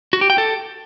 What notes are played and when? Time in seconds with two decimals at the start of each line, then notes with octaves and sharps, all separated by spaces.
0.13 F#4
0.21 G4
0.30 G5
0.38 A4